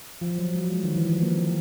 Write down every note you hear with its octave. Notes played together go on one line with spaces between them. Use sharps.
F3
F#3
G3
G#3
D#3
E3
F3
A#3
C4